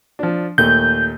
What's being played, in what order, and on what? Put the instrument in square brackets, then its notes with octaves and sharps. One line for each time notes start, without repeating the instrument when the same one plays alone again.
[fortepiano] F3 D4
[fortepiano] D#2 A#2 A3 [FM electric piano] G6